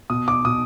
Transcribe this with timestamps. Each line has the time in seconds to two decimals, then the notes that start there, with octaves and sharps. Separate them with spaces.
0.10 B2 D#6
0.28 D6
0.45 B2 D#6